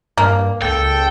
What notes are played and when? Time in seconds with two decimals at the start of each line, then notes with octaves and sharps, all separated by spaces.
0.17 G2 A#3
0.62 C#2 A4 G5